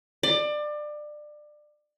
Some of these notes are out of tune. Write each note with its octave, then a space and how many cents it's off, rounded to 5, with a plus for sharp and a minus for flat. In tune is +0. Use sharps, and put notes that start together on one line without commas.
D5 +25